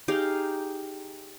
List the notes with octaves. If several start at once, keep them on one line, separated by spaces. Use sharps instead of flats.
D#4 G4 G#4 F5